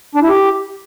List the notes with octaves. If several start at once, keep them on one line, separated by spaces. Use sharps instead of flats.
D4
E4
G4